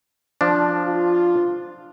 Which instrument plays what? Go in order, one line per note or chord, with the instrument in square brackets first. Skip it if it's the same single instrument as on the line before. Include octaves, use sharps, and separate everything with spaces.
[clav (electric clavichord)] F3 D4
[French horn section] F4